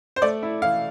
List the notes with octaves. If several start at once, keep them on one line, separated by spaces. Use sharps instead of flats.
C5
A3 D5
E4
E3 F5